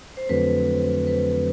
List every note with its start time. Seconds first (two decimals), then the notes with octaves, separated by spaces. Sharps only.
0.17 C5
0.29 F2 D3 F#3 A3 C4 B4
1.07 B4